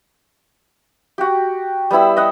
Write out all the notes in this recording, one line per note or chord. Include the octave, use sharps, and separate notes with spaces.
F#4 G4
G3 B3 E4 E6
D#5 F#5